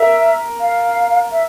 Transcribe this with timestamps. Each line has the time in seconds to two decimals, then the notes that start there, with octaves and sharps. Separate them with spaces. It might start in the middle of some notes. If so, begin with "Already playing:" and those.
Already playing: A#4 E5
0.60 F5
1.32 E5